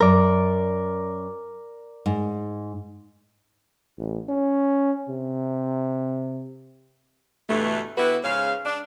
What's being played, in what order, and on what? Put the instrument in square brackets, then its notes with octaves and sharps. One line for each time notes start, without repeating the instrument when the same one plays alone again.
[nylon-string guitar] F#2 [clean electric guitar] A#4 D5
[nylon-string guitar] G#2
[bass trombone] A1
C#4
C3
[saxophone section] D2 G2 B2 E3 A3
D3 B3 E4 F#4 G4 B4
G#2 C#3 C#4 F5
D4